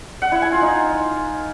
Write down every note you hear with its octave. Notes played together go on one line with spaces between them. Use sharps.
F#5
E4
G#5
F4
D#4